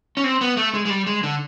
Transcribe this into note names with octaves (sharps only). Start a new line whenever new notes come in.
C#4
C4
B3
A3
G#3
G#3
G3
G#3
D3